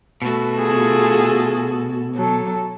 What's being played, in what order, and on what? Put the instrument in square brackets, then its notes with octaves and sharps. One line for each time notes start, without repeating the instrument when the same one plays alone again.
[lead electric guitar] B2 [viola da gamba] A3 F#4 A4
[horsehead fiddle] F4 G#4
F#3 A4